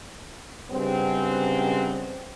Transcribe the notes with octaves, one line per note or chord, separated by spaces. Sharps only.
G2 C#3 F#3 G#3 C4